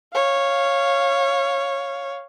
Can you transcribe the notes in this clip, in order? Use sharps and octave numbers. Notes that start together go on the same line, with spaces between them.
C#5 F5